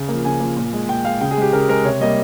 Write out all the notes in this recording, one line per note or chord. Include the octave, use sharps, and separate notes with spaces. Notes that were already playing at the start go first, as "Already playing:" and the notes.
Already playing: C#3
F3 A#3
C#3 G#5
F3 A#3
A#2
G#3
A#2 G5
G#3 F5
C#3 G5
G#4
G#3 G4
C#3 A#4
G#3 A#4
C3 C#5
G3 A#3 D#5